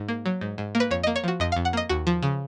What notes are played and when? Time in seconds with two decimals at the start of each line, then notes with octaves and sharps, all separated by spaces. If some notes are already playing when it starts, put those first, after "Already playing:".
Already playing: G#2
0.09 A#3
0.26 F#3
0.41 G#2
0.58 G#2
0.75 A#3
0.80 B4
0.91 F2 C#5
1.03 A#3 D#5
1.16 C#5
1.24 F3 F#4
1.40 F2 D#5
1.52 F5
1.57 F2
1.65 F#5
1.73 A#3 D#5
1.89 D#2 F#4
2.07 F3
2.23 C#3